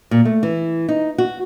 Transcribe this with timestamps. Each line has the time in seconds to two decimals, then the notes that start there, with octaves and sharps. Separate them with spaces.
0.11 A#2
0.25 A3
0.43 E3
0.89 D#4
1.18 F#4